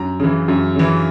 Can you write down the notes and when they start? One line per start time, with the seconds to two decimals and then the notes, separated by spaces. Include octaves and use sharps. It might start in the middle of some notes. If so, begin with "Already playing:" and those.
Already playing: F#2 A#5
0.20 C#3 E3
0.48 F#2
0.75 C#3 E3